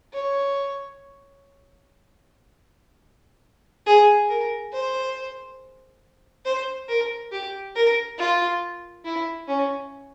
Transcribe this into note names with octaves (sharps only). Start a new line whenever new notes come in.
C#5
G#4
A#4
C5
C5
A#4
G4
A#4
F4
E4
C#4